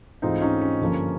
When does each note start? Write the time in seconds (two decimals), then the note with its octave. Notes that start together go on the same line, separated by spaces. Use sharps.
0.22 G#2 E3 A3 C4 D#4 F4
0.42 C#4 D#4
0.61 C#4
0.80 G2 D3 F3 A#3